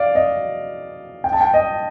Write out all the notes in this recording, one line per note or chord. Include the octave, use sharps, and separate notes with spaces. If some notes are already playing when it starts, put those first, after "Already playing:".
Already playing: D5 F5
D#5
G5
A5
G5
D#5